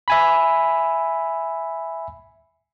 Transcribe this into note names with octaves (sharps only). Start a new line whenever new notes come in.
E5 G#5 B5